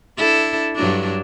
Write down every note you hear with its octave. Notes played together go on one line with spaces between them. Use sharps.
D4 E4 A4
G2 F#3 D4